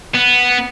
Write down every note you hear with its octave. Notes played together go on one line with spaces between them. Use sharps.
B3